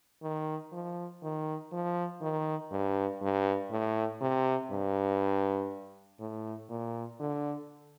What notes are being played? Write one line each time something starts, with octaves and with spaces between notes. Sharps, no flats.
D#3
F3
D#3
F3
D#3
G2
G2
A2
C3
G2
A2
A#2
D3